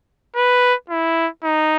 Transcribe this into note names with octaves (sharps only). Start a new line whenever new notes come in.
B4
E4
D#4